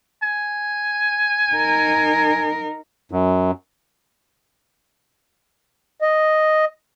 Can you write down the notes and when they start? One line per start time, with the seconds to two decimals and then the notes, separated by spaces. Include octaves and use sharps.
0.23 G#5
1.54 D#4 A#4
3.11 F#2
6.02 D#5